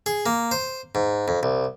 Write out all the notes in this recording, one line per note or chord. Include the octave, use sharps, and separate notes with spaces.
G#4
A#3
C5
G#2
F2
C2